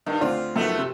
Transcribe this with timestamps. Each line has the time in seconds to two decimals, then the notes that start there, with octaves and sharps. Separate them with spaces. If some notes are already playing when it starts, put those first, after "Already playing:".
0.06 G2 D#3
0.21 D2 C4 F4 D5
0.56 F#2 D#3 F3 A3 B3
0.78 C3